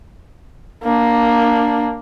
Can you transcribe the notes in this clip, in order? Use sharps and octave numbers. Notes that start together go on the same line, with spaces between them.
A#3 D4